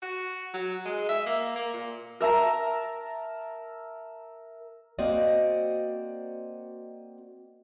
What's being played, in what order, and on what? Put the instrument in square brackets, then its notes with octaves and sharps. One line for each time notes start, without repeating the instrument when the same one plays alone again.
[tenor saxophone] F#4
F#3
G#3
E5
A#3
A#3
A#2
[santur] A#4 E5 A5 A#5
[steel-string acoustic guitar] A#3 C4 F#4 D5 D#5